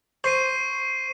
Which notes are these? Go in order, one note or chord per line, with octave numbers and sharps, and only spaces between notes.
C5 C#6 C7 D#7